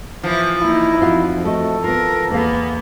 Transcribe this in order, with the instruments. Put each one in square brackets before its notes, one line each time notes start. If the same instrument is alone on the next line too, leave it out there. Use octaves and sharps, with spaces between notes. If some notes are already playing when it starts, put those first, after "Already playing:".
[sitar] E3 F3
[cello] A#3 D#4 [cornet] E4
[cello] F2 [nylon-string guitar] D#4 F4 F#4
[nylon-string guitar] A3 F#4 D#5 [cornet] A4
[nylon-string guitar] B3 F4 [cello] A#4
[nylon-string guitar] E2 F5 [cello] A#3 B3